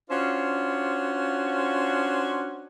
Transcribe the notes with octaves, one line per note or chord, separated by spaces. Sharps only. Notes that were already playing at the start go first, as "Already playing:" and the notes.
C#4 D4 F4 F#4 C5